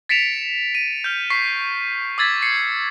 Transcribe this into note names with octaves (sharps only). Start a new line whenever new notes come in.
A6 B6 C#7 D7 E7 F7
D#7
F6 G6
C#6 B6 C7
D6 E6 G#6 A6 B6
C7 C#7